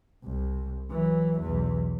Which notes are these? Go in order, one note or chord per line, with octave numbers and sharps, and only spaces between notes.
C2
E3 F#3
B1 E2